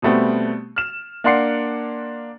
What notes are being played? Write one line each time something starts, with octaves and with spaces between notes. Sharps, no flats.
B2 G3 A3 B3 C4
F6 E7
A#3 D4 F#5 C6 C7 C#7